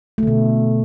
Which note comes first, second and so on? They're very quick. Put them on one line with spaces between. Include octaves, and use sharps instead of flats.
A3 D3 B2